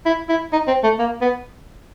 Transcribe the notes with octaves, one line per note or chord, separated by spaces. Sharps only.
E4
E4
D#4
C4
A3
A#3
B3